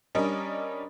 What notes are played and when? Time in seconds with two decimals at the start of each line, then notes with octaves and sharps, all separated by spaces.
0.15 G3 C#4 D4 A#4 D#5